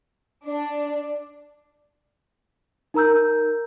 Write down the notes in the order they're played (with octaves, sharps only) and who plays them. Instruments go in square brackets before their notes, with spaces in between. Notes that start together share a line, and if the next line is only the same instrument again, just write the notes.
[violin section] D4
[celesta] D#4 A#4 A#5 E6 G6